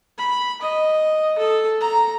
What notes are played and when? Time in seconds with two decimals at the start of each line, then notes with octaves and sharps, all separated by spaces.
0.18 B5
0.61 D#5
1.38 A4
1.81 A#5